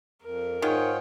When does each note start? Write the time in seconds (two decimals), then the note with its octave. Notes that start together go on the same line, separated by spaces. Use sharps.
0.23 F2 A#4
0.62 G#2 D#3 F4 G#4 C#5 F#5 G5